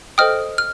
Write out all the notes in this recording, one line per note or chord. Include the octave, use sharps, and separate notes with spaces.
A4 C5 D#5 G5 D#6 F6
F6